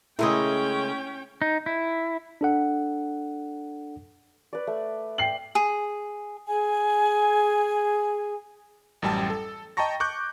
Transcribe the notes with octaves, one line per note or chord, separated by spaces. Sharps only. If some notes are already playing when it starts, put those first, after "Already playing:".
C#3 G#3 A3 C#4 E4 A#4 D#5 G5
D#4
E4
D4 A4 F#5
B4 D5
A3
G5 C7 F#7
G#4
G#4 G#5
A1 F#2 G3 G5 A5
A4
D#5 G5 A5 A#5 C#6 A#6
C#6 D6 F#6 G6